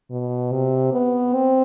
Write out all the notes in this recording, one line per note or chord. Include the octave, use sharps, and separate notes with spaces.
B2
C3
B3
C4